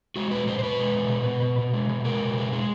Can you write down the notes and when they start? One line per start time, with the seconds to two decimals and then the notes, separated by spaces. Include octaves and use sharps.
0.16 G#3 F#4
0.31 B2 B4
0.47 B2 C5
0.59 C5
0.63 B2 B4
0.80 G#3
0.95 B2
1.10 B2
1.26 B2
1.42 B2
1.58 B2
1.73 G#3
1.89 B2
2.05 G#3 A#4
2.21 B2
2.37 G#3
2.52 G#3